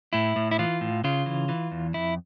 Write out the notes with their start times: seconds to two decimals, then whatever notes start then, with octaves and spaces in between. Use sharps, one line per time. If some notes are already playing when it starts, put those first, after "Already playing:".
0.13 A2 E4
0.36 A2
0.51 E4
0.59 E3 F4
0.81 A2
1.04 C#3 F4
1.26 E3
1.49 E3
1.71 E2
1.94 F2 E4